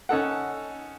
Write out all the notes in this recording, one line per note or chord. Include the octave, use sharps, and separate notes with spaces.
C#4 D#4 A4 F#5